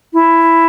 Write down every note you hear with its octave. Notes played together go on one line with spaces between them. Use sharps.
E4